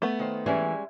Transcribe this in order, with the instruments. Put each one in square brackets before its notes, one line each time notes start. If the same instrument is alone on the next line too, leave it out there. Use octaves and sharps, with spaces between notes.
[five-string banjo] A3 B3
[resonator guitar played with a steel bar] D#3 C5
[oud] E3 [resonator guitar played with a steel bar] G3 G#3 C#4